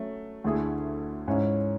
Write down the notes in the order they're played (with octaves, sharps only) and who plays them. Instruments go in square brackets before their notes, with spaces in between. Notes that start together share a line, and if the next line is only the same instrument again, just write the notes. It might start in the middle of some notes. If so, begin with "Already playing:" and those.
Already playing: [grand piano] F#3 A3 C#4
D2 D3 A3 E4 G#4
G#2 G#3 C#4 E4